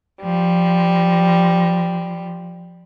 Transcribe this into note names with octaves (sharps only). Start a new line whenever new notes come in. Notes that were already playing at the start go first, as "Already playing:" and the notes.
F3 G3